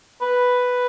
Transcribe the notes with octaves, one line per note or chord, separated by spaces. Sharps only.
B4